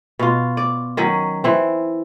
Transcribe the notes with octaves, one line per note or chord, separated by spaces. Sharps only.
B2 F4
D5
D#3 F#3 C#4
E3 C4